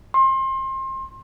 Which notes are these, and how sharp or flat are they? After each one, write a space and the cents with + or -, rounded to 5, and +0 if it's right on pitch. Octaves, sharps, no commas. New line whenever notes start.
C6 +30